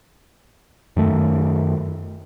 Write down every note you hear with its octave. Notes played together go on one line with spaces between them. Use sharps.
F#2 D#3 A3